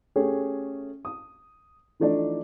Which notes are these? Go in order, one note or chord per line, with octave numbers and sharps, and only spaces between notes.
A3 C#4 G4 G#4
D#6
E3 F3 A3 D4 D#4 D5